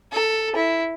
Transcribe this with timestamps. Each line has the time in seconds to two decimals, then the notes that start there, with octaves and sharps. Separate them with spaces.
0.12 A4
0.55 E4